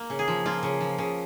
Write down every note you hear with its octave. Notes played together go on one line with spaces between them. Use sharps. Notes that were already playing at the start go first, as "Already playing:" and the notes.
Already playing: A#3
C#3
G#4
F3
A#3 F4
C#3
F3
C#3